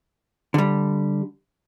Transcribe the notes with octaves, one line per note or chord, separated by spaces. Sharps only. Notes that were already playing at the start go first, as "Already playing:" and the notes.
D3 G3